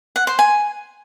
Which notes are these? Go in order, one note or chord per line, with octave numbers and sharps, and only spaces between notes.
F#5
C5
G#5